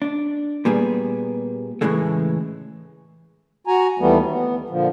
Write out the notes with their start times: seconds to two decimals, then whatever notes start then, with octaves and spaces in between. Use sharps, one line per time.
0.02 D4
0.65 A#2 G3 B3 G#4
1.81 A2 C#3 E3 G#3 A3
3.67 F#4 G#5 A#5
3.99 D#2 E3 G3 A3 B3
4.29 B3
4.70 A#2 D3 F3